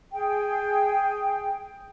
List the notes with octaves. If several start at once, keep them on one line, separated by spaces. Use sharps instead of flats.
G#4 G5